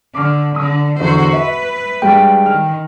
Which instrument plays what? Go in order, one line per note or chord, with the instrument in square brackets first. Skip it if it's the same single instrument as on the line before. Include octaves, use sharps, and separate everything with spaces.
[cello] D3 [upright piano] D6 F6
[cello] D3 [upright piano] D#6
[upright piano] E2 D3 [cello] F#4 C5
[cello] B4 [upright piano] E5
[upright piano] G2 G#3 [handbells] G5
[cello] D#3 [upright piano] F6